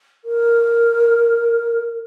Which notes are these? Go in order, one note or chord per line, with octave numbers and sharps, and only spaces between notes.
A#4